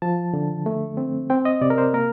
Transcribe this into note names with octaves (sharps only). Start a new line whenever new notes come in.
F3 A5
D3
A3
C4
C4 G5
D#5
C3 D5
A#4
C5
A#3 A#4